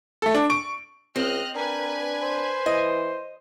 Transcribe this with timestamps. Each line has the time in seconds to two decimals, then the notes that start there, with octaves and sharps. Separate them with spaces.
0.22 A3 A4
0.35 D4
0.50 C#6 D7
1.16 C#2 C4 D#5 F6 F#6
1.55 D4 A#4 B4 G#5
2.22 C5
2.66 E3 D#5